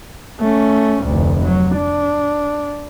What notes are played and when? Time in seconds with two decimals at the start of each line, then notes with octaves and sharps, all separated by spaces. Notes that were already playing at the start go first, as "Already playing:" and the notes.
0.40 A3 C#4
1.04 F1 D2
1.44 F#3
1.76 D4